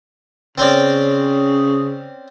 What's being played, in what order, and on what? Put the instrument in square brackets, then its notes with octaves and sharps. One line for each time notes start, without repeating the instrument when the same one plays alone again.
[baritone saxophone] C#3 [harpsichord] C4 C#4 D5